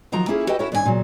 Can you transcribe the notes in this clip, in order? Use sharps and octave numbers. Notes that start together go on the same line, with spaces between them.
D#3 F3 F#3 A#5
A#3 C#4 E4 F4 G#4 A4
F#4 G4 A4 B4 D#5 G5
C#4 E4 F#4 A4 A#4 C#5
G2 D#3 C#4 G4 G#5
A#2 C#3 F#3